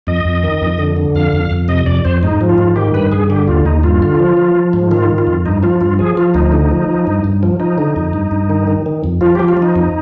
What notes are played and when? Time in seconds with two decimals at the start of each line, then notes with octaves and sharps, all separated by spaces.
0.07 F2 D#5
0.25 F2
0.43 D#3
0.62 F2
0.78 D3
0.96 D3
1.15 F2 F5
1.33 F2
1.51 F2
1.68 C3 D#5
1.86 F2 D5
2.05 F2 C5
2.23 G#2 D#4
2.41 F3
2.49 F4
2.58 G#2
2.76 D#3 G4
2.94 G2 B4
3.12 G2 G#4
3.30 D3 G4
3.47 D#2 F4
3.65 D#2 D#4
3.83 G2 F4
4.02 D3
4.19 F3
4.37 F3
4.55 F3
4.73 G#2
4.91 D#3 F4
5.10 D#3
5.18 F4
5.27 F2
5.46 G2 D#4
5.63 F3 F4
5.81 G2 F4
5.99 F3 G#4
6.17 F3 F4
6.34 D2 D#4
6.52 D3
6.71 F3
6.88 F3
7.07 G2
7.24 G2
7.43 F3
7.60 F3 D#4
7.78 D3
7.96 F2
8.13 G2
8.31 G2
8.50 D#3
8.67 D#3
8.86 D#3
9.04 F2
9.21 F3 F4
9.35 F3 G4
9.48 F4
9.57 F3
9.62 D#4
9.76 F2